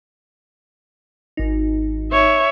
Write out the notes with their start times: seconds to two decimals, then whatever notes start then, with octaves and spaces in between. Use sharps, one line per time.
1.37 G#1 D#4
2.12 C#5 E5